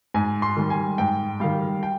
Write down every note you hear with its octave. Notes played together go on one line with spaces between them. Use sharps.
G#2 G#5
C6
D#3 G3
G#5
G#2 G5
D#3 G3 F5
G5